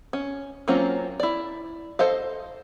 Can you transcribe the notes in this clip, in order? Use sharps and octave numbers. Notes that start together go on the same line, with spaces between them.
C#4
F#3 A#3 C4 C#4 F4
E4 D5
A4 C5 D#5 F5